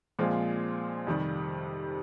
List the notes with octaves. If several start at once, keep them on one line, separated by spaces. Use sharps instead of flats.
A#2 F3 G#3 C4 F4
F2 C3 D#3 G3